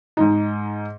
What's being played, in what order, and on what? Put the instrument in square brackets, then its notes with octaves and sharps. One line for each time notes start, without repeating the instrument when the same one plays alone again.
[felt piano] G#2 D#4